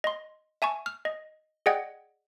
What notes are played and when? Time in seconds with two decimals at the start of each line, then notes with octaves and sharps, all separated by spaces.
0.04 D#5 C6
0.62 E5 G#5 A5 C#6
0.86 F6
1.05 D#5
1.66 G#4 D5 D#5 F#5 G5 G#6